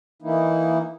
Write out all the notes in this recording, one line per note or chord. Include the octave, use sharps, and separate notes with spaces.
E3 A#3 D#4 E4